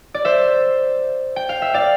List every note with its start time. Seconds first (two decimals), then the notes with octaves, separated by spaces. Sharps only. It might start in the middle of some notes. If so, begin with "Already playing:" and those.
0.14 D5
0.25 C5 E5
1.36 G5
1.49 F5
1.62 E5
1.74 D5 F5